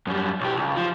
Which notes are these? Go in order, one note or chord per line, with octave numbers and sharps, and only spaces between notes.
F#2 G3
B1 G4
C#2
F3